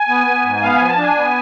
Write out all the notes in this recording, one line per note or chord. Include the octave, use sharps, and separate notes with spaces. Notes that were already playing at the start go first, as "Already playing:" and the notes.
Already playing: G#5
B3
B3
G#2
B3 F5
F3 G#5
A5
D4 G#5
B3